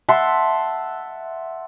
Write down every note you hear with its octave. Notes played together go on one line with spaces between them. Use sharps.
E5 F#5 A5 C6